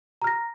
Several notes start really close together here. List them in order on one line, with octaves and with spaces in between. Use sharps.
A#5 F6 A#6